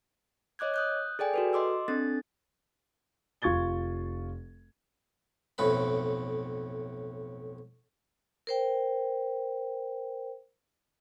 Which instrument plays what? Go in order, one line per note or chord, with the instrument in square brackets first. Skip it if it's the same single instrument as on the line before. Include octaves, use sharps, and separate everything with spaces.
[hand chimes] C#5 D#5 D6 F#6 G#6
D#6 F#6 G6
G#4 A4 D5 G5 G#5
F#4 A4 B4
D#5 C6 D6 E6
C4 D4 A4 A6
[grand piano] F1 F4 C#6 G#6 A6 G7
[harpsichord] B1 F2 A2 B4 B5
[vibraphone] A#4 C5 G5